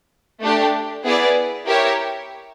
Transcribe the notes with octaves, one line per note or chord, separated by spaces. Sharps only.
A3 D4 G4
B3 E4 G#4 B4 D5
E4 G4 A#4 C#5 E5